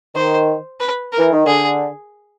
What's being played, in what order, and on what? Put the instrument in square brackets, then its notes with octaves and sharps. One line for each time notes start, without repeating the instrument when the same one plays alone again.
[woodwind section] D#3 [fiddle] C5
[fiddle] B4
A#4
[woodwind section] E3
D#3
[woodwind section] D3 [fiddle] G#4